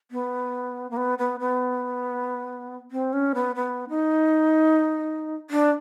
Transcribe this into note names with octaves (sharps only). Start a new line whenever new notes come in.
B3
A#3
B3
B3
B3
C4
C#4
B3
B3
D#4
D4